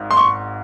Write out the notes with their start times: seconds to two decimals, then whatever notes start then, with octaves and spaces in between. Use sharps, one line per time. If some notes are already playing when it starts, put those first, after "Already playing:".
Already playing: G#1 G#2
0.11 C6
0.17 C#6